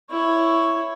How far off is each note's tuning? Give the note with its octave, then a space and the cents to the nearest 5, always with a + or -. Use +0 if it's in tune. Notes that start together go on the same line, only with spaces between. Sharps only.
E4 +5 C#5 +0